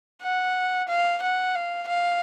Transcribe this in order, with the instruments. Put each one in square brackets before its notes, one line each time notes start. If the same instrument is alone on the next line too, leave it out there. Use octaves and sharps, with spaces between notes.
[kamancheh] F#5
F5
F#5
F5
F5